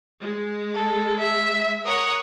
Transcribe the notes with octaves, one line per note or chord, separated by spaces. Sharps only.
G#3
A4
E5
A#4 C#5 F#5 D#6